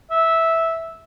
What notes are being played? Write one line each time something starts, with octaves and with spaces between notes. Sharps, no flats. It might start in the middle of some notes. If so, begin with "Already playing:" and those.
E5